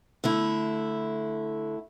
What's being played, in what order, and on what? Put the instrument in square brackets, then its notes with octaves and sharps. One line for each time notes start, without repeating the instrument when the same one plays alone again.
[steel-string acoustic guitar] D3 A3 E4